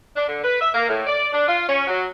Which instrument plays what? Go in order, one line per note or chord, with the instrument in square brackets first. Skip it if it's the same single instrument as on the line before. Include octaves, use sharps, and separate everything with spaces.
[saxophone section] D4
D3
B4
E5
A#3
A2
D5
D4
F4
C#4
F#3